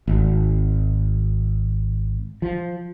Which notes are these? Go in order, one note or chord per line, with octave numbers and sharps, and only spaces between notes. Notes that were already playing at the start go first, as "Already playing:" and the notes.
G#1
F3